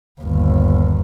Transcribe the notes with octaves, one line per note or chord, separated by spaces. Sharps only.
G1 D#2